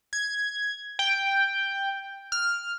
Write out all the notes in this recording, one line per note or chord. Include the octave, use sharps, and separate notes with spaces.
G#6
G5
F6